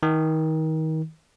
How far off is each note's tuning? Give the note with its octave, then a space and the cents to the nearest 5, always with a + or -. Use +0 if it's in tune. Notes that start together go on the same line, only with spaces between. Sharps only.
D#3 +30